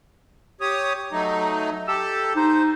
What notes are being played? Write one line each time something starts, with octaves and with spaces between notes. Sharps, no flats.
G4 C#5 D#6
F#3 A3 D#4
G4 A4 E6
D#4 C5